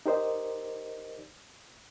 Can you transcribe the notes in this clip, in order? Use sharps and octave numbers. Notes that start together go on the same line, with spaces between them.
D#4 G4 A#4 C5 D5 D#5